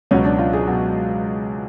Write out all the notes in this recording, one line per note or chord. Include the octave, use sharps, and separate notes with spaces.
C#2 B2 F#3 C#4
D4
F4
G#4
B2 F#3